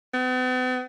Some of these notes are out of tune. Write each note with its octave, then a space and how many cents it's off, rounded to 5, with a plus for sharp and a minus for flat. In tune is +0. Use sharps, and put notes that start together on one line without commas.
B3 +45